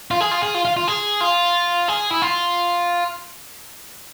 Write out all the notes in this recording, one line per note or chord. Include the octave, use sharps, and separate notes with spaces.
F4
G#4
F4
G#4
F4
F4
F4
G#4
F4
G#4
E4
F4